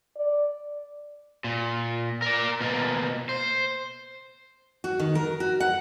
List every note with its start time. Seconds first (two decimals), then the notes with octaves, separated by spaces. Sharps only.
0.16 D5
1.44 A#2
2.22 A#4 D5
2.61 B2 A#3
3.29 C5
4.84 F#4
5.00 D#3
5.15 A#4
5.40 F#4
5.60 F#5